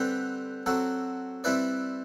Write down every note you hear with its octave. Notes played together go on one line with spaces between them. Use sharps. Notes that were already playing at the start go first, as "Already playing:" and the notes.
Already playing: D3 G3 C4 G4 B4
F#3 C4 F#4 A4
G3 C4 E4 B4 D5